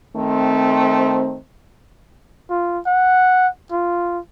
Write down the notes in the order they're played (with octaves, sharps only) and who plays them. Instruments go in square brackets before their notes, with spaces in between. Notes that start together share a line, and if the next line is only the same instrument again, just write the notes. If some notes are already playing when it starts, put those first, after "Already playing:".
[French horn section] D#3 A3 C4
[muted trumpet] F4
F#5
F4